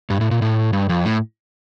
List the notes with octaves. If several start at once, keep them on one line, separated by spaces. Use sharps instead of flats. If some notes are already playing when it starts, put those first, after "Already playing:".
G2
A2
A#2
A2
G2
F2
A2